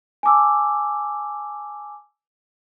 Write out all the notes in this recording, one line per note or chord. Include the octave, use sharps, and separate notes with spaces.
G#5 A5 D6 E6